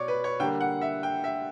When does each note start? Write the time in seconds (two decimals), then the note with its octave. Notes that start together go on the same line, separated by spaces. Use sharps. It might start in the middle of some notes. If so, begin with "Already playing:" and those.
Already playing: B2 C#5 D5
0.08 B4
0.24 C#5
0.40 D3 G3 A#3 G5
0.61 F#5
0.81 E5
1.03 G5
1.24 E5